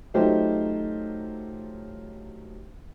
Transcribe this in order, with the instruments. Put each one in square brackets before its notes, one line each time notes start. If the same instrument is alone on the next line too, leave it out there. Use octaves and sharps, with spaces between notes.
[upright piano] F#3 A3 D#4 F4 G4 C5